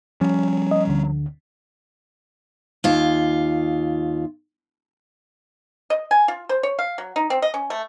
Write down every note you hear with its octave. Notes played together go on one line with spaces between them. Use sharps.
F3 G3 C#4
D#5
D2 D3
D#2 F4
D#5
G#5
F4
C5
C#5
F5
F#3
D#4
C4
D#5
C#4
A3